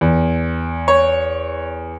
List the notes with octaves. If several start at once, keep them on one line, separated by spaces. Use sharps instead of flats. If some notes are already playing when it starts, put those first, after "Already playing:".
E2
C#5